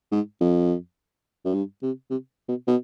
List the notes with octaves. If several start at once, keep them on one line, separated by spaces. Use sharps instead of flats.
G#2
F2
F#2
G2
C3
C3
B2
B2